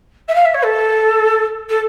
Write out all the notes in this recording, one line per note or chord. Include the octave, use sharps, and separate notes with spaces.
E5
F5
E5
C#5
A4
A4